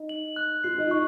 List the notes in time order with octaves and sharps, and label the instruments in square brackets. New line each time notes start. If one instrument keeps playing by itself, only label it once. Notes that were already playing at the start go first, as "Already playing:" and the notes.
Already playing: [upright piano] D#4
[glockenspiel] F#7
F#6
[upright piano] F4 [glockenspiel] C7
[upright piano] D#4
[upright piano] D#4 [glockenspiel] C#6